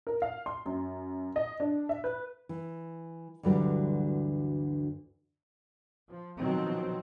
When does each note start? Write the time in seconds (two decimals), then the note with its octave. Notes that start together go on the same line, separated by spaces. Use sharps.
0.07 A#4
0.22 F5
0.46 C6
0.66 F#2
1.36 D#5
1.60 D4
1.89 E5
2.04 B4
2.49 E3
3.43 D2 G2 D3 E3 F#3 G3
6.07 F3
6.39 B2 D#3 F3 F#3 C4